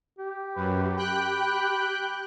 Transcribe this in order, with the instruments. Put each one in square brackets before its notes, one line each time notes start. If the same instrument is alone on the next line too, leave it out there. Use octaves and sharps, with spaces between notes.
[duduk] G4
[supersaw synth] F#2 [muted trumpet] B4
[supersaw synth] G5 F#6 [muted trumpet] B5